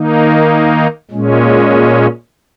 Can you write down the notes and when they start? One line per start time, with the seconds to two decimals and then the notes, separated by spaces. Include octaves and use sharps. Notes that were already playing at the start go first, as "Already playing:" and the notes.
Already playing: D#3 A#3 D#4
1.11 A#2 G#3 C#4